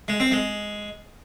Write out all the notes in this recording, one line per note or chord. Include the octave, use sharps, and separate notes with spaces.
G#3
C4
G#3